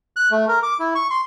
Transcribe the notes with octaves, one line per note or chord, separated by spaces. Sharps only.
F#6
A3
A#4
D6
E4
C#6
C6